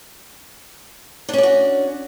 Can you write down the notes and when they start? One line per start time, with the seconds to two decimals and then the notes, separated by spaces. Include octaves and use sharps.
1.29 D4
1.33 C#4
1.38 D5
1.43 F#4